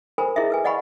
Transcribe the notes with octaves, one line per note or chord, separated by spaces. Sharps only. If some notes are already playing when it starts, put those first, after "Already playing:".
A4 A#4 C5 G#5 B5
E4 G#4 A#4 D#5 E5
A4 B4 G#5
D5 D#5 F#5 G#5 B5 C#6